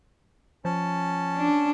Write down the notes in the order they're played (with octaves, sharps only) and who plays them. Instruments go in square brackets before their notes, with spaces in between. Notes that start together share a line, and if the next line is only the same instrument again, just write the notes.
[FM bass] F3 [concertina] C#4 A5
[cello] D4